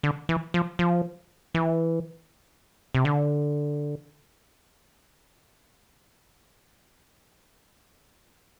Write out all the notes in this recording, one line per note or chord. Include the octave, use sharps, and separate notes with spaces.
D3
E3
F3
F3
E3
C3
D3